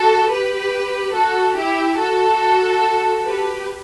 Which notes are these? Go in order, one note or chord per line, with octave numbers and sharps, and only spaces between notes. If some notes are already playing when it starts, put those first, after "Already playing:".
Already playing: F#4 A4
G4 B4
F#4 A4
E4 G4
F#4 A4
G4 B4